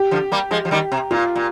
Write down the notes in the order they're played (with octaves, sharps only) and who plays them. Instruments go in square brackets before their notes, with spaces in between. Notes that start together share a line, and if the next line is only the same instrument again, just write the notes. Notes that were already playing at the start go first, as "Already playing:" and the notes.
Already playing: [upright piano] G4
[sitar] D3 F3
G3 A#3
F3 G#3
F3
D#3 G3
C3
[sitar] A#2 [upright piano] F4
[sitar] A#2